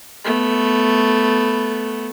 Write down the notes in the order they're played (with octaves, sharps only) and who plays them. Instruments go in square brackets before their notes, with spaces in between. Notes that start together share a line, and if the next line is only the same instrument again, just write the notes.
[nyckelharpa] A3 B3